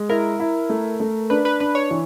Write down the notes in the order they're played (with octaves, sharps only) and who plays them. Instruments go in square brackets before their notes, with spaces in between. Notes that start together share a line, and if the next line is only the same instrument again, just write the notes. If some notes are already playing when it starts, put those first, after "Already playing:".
Already playing: [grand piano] G#3
[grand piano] E4 [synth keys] A#4
[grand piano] E4
A3
A3
[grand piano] D4 [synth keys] B4
[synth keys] B4
[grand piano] D4 [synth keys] B4
[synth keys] C#5
[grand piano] E3